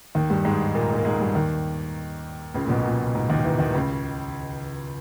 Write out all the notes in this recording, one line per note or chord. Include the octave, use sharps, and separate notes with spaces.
D#2 D#3
G2 G3
G#2 G#3
A#2 A#3
G#2 G#3
A#3
G#2 G#3
G2 G3
D#2 D#3
C#2 C#3
A#2
B1 B2
A#2
G#2
D#2 D#3
E2 E3
D#2 D#3
C#2 C#3